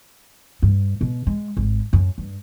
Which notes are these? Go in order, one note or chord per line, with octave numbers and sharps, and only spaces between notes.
G2
B2
G#3
G#1
F#2
G2